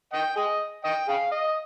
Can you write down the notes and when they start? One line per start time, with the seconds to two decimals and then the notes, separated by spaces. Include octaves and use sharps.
0.13 D#5 G5
0.37 G#4 D#5
0.84 D#5 G5
1.08 G#4 F5
1.31 D#5